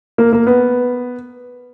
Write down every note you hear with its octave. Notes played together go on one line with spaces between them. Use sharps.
A#3
A#3
B3